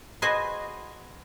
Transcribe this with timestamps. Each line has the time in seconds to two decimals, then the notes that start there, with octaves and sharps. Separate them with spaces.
0.22 F#4 G#4 B4 C5 D#5 G#5